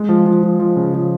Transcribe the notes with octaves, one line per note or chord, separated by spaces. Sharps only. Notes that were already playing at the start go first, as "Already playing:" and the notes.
Already playing: G#3
F3
F3
F3
F3
C#3
F3